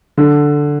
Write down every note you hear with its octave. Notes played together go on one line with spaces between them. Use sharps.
D3